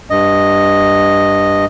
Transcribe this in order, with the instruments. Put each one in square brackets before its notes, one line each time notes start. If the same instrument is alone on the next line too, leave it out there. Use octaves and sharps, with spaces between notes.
[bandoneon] G2 D#5